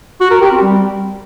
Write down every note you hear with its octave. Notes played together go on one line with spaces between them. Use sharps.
F#4
A#4
G4
C4
G3